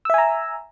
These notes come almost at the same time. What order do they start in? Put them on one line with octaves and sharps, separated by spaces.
E6 E5 G#5 A#5